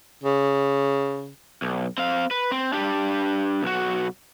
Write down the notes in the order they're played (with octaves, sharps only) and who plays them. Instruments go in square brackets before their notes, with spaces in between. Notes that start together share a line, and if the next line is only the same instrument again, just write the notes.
[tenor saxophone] C#3
[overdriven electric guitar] B1
C4 F5
B4
C4
D4 G4
B1 F#4